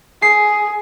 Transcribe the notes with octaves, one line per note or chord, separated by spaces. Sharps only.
G#4 C7